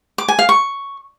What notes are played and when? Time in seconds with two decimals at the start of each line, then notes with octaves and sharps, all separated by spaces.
0.18 D6
0.28 G#5
0.39 F5
0.49 C#6